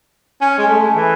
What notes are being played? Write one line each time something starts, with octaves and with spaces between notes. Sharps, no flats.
C#4
G#3
A3
E3